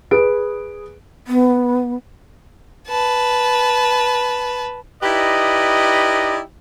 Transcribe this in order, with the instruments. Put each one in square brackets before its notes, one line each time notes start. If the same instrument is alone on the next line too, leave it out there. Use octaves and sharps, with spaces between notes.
[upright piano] G#4 B4 D7
[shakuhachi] B3
[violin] B4 A5
[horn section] D#4 E4 G4 B4 D5 D#5